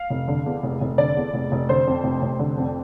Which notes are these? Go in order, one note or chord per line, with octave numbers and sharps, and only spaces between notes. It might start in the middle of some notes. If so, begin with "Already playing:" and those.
Already playing: F5
F1
D3
E2
F1
F1
D3 D5
E2
F1
F1
D3 C5
F2
F1
F1
D3
F2